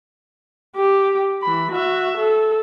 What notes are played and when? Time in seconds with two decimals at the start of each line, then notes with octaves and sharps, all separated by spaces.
0.76 G4
1.43 E3 B5
1.72 F#4 E5
2.18 A4